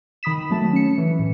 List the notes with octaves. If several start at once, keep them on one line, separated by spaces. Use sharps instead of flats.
D#3 B5 D#6 B6 E7
F#3 A3 A5
C#4 C#7
E3
A2